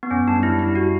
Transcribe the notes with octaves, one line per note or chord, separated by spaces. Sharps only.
B3
F#2 C#4
G3 D4
G3 E4
G3 E4
F#4